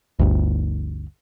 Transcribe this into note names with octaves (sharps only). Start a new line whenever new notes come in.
G1 D2